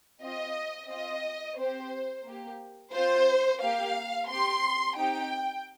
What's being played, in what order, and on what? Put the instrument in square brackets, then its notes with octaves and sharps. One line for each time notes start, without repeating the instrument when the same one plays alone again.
[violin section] C4 F4 D#5
C4 F4 D#5
C4 G4 C5
A#3 G4
C4 F4 C5
A#3 G4 F5
C4 G4 C6
C4 D#4 G4 G5